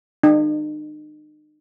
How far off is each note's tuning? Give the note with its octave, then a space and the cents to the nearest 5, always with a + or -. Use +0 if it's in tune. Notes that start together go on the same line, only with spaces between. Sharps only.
D#4 -45